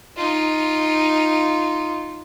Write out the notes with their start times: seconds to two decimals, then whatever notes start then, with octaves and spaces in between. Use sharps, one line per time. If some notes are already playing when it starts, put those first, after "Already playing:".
0.17 D#4 F4